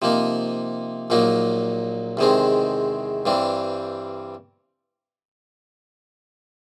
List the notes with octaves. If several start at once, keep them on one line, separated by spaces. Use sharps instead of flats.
C3 F3 A#3 D#4
A#1 A#2 F#3 A#3 D#4
E2 C3 D#3 G#3 C4
G2 E3 G3 C4